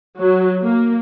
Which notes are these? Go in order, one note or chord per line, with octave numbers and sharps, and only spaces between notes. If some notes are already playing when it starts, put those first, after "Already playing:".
F#3
A#3